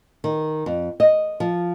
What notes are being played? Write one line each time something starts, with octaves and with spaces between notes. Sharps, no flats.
D#3
F2
D#5
F3